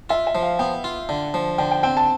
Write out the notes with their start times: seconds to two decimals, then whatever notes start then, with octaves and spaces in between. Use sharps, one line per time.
0.10 F4 E5
0.27 E5
0.35 F3
0.43 F5
0.59 B3 G5
0.84 F4
1.09 D3
1.34 F3
1.58 D3 G5
1.71 G5
1.83 C4 G5
1.97 A5